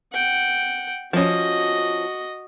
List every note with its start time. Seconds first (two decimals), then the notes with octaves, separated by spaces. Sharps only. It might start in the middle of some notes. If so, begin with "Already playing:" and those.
0.13 F#5 G5
1.13 F3 C#4 F#4 D#5